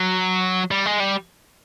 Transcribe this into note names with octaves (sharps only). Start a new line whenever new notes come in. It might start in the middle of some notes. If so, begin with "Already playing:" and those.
Already playing: F#3
G3
G#3
G3